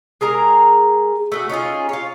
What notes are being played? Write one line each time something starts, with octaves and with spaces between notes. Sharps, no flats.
G#3 G#4 A#4 A#5
A3 F#4 G#4
C#4 D#4 F4 G#4
F4 C#5